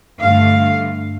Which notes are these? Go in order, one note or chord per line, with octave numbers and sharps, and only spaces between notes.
G2 D3 A3 F5